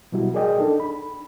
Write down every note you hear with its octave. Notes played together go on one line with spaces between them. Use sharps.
B2 F#3 G3 E4 F#4
G#4 A#4 D5 D#5 G5
D4 D#4 A4
B5